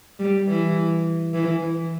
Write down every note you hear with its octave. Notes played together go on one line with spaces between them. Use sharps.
G3
E3
E3